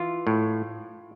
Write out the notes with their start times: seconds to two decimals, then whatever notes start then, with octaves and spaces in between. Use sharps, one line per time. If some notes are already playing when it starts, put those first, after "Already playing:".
Already playing: E3 F4
0.27 A2